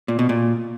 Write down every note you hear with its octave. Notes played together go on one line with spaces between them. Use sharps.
A#2
B2
A#2